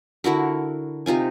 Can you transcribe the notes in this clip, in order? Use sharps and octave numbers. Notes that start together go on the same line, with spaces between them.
D3 E4 F#4 A#4
C3 D#4 F4 G#5